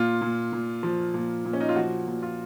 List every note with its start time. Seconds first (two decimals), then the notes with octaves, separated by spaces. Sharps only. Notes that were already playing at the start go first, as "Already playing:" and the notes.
Already playing: A#2 F4
0.21 A#2
0.53 A#2
0.83 F3
1.14 A#2
1.45 A#2
1.53 C#4
1.60 D#4
1.69 F4
1.75 F3 F#4
2.07 A#2
2.23 F4